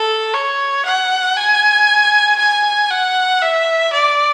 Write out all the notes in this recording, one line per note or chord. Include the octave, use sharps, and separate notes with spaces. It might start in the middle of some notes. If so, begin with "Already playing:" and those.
Already playing: A4
C#5
F#5
G#5
G#5
F#5
E5
D5